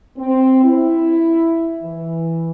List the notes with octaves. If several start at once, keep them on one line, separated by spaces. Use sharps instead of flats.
C4
E4
E3